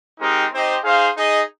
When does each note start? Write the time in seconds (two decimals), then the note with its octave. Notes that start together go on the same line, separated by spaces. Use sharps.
0.20 G#3 C4 D#4 G4 A#4
0.53 C4 D#4 G4 C5 D#5
0.84 D#4 G#4 C5 F5
1.16 D#4 G#4 D#5